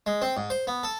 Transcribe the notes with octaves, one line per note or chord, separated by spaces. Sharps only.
G#3
C4
G#2
C5
B3
A4